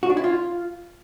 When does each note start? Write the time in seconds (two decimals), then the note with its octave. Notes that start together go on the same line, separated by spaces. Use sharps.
0.03 F#4
0.10 D4
0.17 E4
0.24 F4